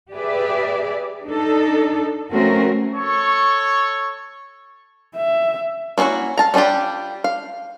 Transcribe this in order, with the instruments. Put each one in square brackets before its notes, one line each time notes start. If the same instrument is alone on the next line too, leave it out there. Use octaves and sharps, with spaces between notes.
[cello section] G4 G#4 B4 D5 E5
D4 D#4 A4
F3 A3 C4 C#4 F#4 A#4
[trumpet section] A4 C#5 C#6
[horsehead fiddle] E5
[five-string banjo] A#3 C#4 D#4 E4 F#4
F5 A5 A#5
G3 C#4 D4 F4 G4
F5